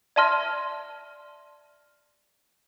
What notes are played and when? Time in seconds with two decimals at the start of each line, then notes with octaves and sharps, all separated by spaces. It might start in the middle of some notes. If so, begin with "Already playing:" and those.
0.16 D5 E5 A5 C6 F6 A#6